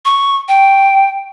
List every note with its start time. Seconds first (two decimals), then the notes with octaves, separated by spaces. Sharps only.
0.05 C#6
0.48 G5